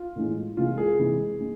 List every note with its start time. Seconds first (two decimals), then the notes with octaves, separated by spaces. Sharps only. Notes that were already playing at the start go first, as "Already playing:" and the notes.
Already playing: F4
0.16 A2 E3 G#3
0.57 C3 E3 G#3 F4
0.78 G#4
0.99 C3 E3 G#3
1.41 G#3